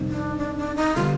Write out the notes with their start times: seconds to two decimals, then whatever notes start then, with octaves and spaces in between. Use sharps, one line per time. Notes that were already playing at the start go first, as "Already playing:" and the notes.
Already playing: F2 C3 D#3 G3 C4
0.09 D4
0.38 D4
0.57 D4
0.76 D#4
0.96 D3 G3 B3 D4 F4